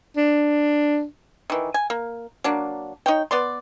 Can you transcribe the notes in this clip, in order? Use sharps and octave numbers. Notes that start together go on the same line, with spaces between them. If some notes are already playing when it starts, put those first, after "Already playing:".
D4
D#3 E3
G#5
A#3
F#3 A#3 D4
D#4 C#5 G5
B3 D5 C6